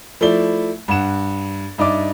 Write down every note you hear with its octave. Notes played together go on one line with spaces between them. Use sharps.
F3 A3 E4 D5 G7
G2 F#5 E7
G2 D#4 D5 E5 D6